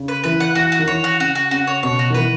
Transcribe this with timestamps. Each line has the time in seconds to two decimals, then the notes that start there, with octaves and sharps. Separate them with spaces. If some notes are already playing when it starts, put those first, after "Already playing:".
Already playing: C#3
0.08 B4
0.24 E3 B4
0.40 F#5
0.55 E3 F#4
0.72 F#4
0.79 D#3
0.87 E3 C#5
1.04 F#4
1.20 C#3 F#4
1.35 F#4
1.51 C#3 F#4
1.67 C#5
1.83 B2 C#5
1.99 F#4
2.10 D#3
2.14 E3 B4